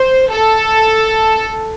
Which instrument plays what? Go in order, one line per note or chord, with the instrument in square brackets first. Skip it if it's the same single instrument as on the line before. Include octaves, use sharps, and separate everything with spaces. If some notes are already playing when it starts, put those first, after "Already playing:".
Already playing: [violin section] C5
A4